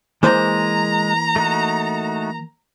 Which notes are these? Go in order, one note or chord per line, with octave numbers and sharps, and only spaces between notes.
E3 G#3 A#3 C5 A#5
A3 D#4 F#4